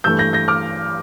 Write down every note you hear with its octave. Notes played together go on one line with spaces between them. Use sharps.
G2 E3 A3 E6 G6
G6 A#6
G6 A#6
D6 F6